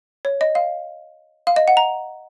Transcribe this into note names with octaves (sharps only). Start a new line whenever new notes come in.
C#5
D#5
F5
F5
D#5
F#5
A#5